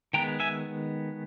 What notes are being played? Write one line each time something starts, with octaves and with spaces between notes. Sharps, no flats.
D#3 G#3 B3 G5 A#5
E5 G#5